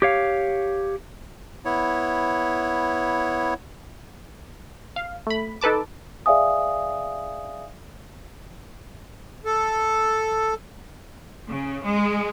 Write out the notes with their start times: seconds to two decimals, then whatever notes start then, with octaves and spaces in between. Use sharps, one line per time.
0.02 G4 C#5 F5
1.65 B3 E4 C#5
4.96 F5
5.27 A3 B5
5.61 D#4 A4 B4 A5 D6
6.26 G#4 D5 E5 F5 G#5 D#6
9.45 A4
11.49 C#3
11.84 G#3